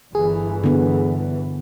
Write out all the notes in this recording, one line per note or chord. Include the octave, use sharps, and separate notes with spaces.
G1 E3 G#4
D3 B3